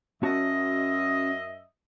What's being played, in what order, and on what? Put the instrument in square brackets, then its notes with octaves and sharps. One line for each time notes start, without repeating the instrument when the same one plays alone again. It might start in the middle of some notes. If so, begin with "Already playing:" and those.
[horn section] F#2 D#5 E5 [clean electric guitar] C#4 F#4 A5